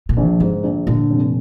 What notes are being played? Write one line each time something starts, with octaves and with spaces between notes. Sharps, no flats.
A#2
A#1
F3
G#2 D3
A#1
A#2 D3
F1